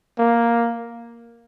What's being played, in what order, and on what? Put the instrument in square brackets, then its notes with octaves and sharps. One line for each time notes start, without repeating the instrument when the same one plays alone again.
[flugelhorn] A#3